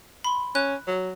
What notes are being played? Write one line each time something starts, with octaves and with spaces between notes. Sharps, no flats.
B5 C6
C#4 F#6
F#3